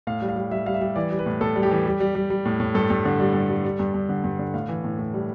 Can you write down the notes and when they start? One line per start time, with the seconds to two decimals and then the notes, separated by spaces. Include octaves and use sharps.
0.07 A2 F5
0.22 G3
0.29 F5
0.36 G3
0.51 G3 E5
0.66 G3 F5
0.74 E5
0.81 G3
0.96 E3 D5
1.11 G3
1.19 B4
1.26 A2
1.41 A2 A4
1.56 G3
1.63 G4
1.71 E3
1.86 G3
2.00 G3
2.15 G3
2.30 G3
2.45 A2
2.60 A2
2.75 G2 A4
2.90 G2
3.05 D3
3.19 G3
3.34 G2
3.49 G3
3.65 G3
3.79 G2
3.94 G2
4.09 D3
4.24 G2
4.39 D3
4.54 A2 F5
4.69 E3
4.84 A2
4.99 A2
5.14 G3